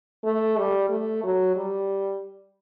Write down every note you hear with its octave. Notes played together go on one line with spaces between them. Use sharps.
A3
G3
A3
F#3
G3